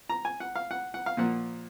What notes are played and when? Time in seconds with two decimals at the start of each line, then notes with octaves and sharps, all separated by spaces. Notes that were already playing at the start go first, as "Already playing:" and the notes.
0.09 A#5
0.25 G#5
0.40 F#5
0.56 F5
0.71 F#5
0.94 F#5
1.06 F5
1.17 A#2 F3 A#3 F#5